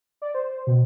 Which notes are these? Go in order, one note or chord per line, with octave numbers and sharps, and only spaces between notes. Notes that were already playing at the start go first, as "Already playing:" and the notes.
D5
C5
B2